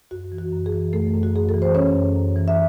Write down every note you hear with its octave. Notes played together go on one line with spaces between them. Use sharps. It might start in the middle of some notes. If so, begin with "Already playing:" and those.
F#2 F#4
E3
F#4
F#2
G#4
E3
F#2 A3 A4
F#2
F#4
F#2 G#4
A4
E3
C5
F#2 C#4 C#5
F#2
F#2
E3
E5